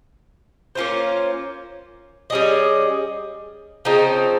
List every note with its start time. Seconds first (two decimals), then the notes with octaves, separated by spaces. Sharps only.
0.75 A#3 C#4 F4 C5
2.30 G3 C#4 G#4 D#5
3.85 C#3 F3 C4 D#4